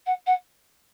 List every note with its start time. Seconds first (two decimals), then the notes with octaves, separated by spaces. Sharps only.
0.06 F#5
0.26 F#5